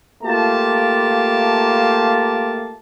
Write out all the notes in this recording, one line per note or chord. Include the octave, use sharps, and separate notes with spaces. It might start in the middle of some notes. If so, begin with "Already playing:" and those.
A3 A#3 F4 G4 A5